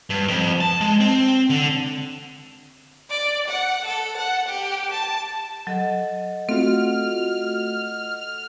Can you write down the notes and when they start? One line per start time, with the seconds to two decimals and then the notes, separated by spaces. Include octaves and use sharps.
0.10 G2
0.28 F2
0.60 A5
0.81 G#3
1.00 C4
1.50 D3
3.10 D5
3.47 F#5
3.85 A4
4.17 F#5
4.48 G4
4.91 A5
5.67 F#3 A4 D#5 F#5
6.49 A3 C4 F4 F#4 F6